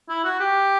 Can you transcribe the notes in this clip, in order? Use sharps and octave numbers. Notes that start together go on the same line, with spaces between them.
E4
F#4
G4